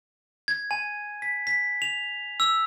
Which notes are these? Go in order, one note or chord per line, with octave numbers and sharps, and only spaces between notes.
G#6
G#5
B6
B6
F7
E6